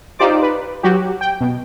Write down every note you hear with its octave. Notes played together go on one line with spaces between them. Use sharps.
D#4 F4 G4 C5 D5 D6
B4
F#3 F#4 G4
G5
B2